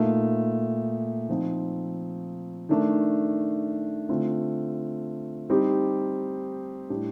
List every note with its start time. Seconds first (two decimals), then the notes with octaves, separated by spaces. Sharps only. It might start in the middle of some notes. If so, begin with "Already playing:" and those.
Already playing: A#2 A3 D#4
1.29 F3 C4 D#4
2.69 D#3 A3 D4
4.09 D3 A3 C4 F4
5.50 G3 C4 D#4 G4
6.90 A2 G3 D4 G4